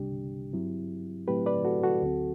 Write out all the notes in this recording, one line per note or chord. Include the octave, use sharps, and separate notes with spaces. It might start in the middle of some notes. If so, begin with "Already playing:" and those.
Already playing: C2 C3 G3 D4 G4
G2 F#3 C4 E4
A2 F#3 A3 C4 E4 G4 B4
B4 D5
F#4 A4
F#4 A4
D2 D3 F#3 C4